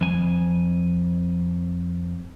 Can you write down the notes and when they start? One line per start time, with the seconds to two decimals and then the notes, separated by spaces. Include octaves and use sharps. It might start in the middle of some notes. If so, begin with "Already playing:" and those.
0.01 F2 G#5